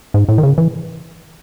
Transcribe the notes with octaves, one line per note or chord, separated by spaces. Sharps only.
G#2
A2
D#3
C#3
E3